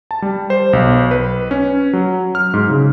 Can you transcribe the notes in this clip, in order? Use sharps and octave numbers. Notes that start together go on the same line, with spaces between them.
A5
G3
C5
B1
B4
C#4
F#3
F6
G#2
C#3